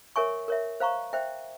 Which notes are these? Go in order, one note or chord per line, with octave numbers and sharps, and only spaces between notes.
A#4 C#5 E5 G#5 C#6
A#4 C#5 E5
C5 F5 A#5 C#6
C5 E5 G5